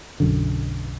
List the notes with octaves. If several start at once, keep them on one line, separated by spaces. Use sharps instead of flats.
B1 F#2 D3